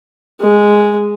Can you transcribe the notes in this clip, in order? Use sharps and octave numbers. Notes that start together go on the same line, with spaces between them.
G#3